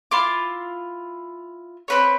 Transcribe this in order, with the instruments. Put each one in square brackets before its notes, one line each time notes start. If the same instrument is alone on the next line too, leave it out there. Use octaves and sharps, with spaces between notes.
[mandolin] E4 F4 C6 D6
C4 B4 C#5